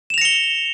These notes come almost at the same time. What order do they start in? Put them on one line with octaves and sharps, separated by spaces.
E7 F7 A#6 C#7 G7